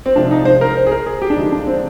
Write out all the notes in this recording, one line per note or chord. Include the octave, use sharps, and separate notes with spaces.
C4
C3 F3 G#3 D4
D#4
C5
A#4
C5
G#4
A#4
G#4
G4
D4
D3 F3 G#3 D#4
D4
C4